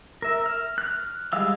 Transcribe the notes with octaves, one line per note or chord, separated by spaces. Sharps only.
A#4 E5
F6
F6 F#6
G3 G#3 F5 E6